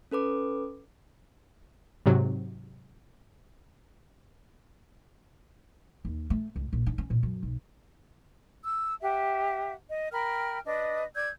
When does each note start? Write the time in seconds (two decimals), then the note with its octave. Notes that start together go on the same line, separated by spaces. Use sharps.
0.11 C#4 A4 B4 D6
2.06 G#2 C3 F#3
6.05 D#2
6.30 A3
6.56 C#2
6.73 A#1
6.86 D4
6.98 C#4
7.10 A#2
7.23 F#2
7.43 B1
8.64 E6
9.00 G4 E5 F#5
9.89 D#5
10.12 A#4 G5 B5 F6
10.66 D4 B4 D#5
11.15 D5 E6 G6 G#6